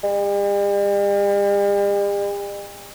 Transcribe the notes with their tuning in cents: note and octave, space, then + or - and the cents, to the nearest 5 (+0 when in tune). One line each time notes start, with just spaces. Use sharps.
G3 +45